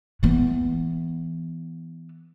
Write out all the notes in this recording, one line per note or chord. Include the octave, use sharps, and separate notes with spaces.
E3 B3